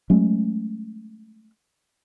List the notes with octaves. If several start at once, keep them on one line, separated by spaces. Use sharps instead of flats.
F#3 G#3 A3 C#4